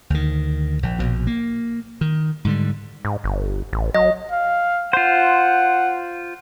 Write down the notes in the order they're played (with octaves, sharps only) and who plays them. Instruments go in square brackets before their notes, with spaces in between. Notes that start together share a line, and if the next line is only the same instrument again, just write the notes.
[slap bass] D2 D#3
A#1
A#1 B2
A#3
D#3
G#2 D3 G3
[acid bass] G#2
G1
A1
[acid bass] F#3 [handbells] D#5
[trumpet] F5
[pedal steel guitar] F4 C5 [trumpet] F#5